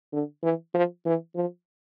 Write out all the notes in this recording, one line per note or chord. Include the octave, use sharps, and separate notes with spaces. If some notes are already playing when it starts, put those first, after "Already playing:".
D3
E3
F3
E3
F3